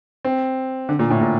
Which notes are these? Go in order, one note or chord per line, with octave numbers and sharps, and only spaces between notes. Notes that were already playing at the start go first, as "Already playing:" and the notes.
C4
D3
A#2
A2
A#2